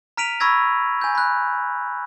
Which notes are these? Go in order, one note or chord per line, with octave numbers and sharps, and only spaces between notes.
A#5 F6 B6 D7 D#7 F7
B5 C#6 E6 G#6 A#6
G#5 G6
B5 F#6